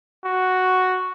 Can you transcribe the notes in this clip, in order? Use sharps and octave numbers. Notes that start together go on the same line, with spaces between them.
F#4